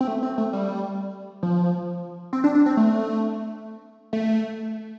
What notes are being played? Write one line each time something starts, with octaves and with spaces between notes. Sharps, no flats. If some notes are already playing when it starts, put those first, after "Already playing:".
C4
A3
C4
A3
G3
F3
C4
D4
D4
C4
A3
A3